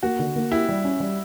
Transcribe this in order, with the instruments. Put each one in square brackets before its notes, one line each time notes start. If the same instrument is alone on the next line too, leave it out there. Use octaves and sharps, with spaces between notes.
[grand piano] A#3 [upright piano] F#4
[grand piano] D3
A#3
[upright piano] E4 [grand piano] G4
[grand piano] G3
C#4
G3